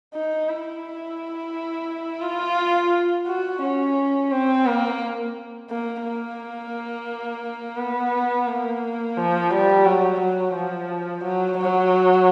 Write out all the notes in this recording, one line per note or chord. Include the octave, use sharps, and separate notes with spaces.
D#4
E4
F4
F#4
C#4
C4
A#3
A#3
A#3
B3
A#3
F3
G3
F#3
F#3
F3
F#3
F#3